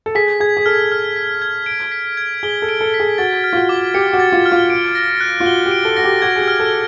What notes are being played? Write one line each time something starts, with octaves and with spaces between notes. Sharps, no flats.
A4
G#4 B6
G#4 G#6
G#4
A4 F6
F6
B6
G#6
D7
B6
G#6
G#4 G7
A4
D7
A4
B6
G#4
F#4 A6
F6
F4
F#4
D6
G4 C#7
F#4
A6
F4
F6
F4
D7
A#6
F#6
F4
F#4 G7
G4
D7
A4
F#4 A#6
G4
F#4 G#6
G#4
G4
F6
A4